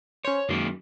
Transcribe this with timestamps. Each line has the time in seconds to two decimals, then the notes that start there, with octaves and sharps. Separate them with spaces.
0.25 C#4 C5 C#5
0.49 F#2 D#3 G#3 A#3